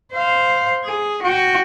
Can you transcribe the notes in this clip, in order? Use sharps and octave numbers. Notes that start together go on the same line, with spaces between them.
C5 F5
G#4
F#4 G5